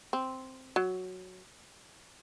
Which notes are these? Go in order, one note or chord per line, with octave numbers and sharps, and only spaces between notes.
C4
F#3